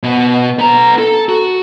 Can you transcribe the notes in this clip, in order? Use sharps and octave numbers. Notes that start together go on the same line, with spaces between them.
B2 B3
B3 A#5
A4
F#4